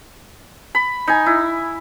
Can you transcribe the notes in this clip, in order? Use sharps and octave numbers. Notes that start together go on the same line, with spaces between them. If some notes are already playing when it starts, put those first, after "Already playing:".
B5
D#4 G#5
E4